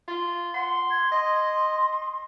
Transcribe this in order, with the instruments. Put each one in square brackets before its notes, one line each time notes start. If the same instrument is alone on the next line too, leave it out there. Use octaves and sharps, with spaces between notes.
[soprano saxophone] F4
[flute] F#5 [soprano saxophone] C6
[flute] G#6
[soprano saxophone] D#5 [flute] C6